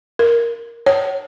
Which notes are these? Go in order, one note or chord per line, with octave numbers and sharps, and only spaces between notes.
A#4
C#5